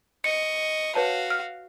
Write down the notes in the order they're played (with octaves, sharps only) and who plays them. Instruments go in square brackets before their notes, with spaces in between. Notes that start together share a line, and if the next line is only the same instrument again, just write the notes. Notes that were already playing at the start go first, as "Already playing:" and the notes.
[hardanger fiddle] D#5 C#6 [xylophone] C#7
[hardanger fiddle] F#4 F5 [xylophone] B4 C#5 A5
[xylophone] F6